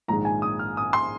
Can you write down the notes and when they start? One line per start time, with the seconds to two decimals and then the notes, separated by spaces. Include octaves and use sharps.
0.08 A#1 G#2 D#3 G#3 A#5
0.25 G#5
0.42 D#6
0.59 F6
0.77 D#6
0.93 C6